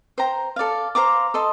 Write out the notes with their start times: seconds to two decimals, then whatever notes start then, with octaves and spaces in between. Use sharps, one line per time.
0.18 C5 G5 A#5
0.56 A4 D5 F5
0.95 C5 F5 A#5 D6
1.34 A4 D#5 A5 C6